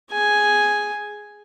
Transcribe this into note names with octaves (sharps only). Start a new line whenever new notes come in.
G#4 G#5